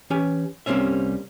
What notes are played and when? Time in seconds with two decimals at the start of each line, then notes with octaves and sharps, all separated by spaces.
0.10 E3 C#4 G4 G#5
0.66 C2 G3 A#3 C4 C#4 E5